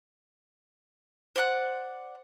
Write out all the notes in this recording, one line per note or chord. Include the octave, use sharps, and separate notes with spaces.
C5 D5 F#5 F#6